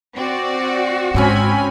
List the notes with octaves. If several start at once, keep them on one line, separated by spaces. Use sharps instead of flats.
C4 F#4 D5
G#2 C#3 C4 C#4 G#5 B5